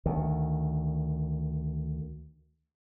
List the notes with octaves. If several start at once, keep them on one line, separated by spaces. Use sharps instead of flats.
D2 D#3